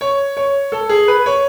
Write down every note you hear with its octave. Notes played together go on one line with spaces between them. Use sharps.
C#5
C#5
A4
G#4
B4
C#5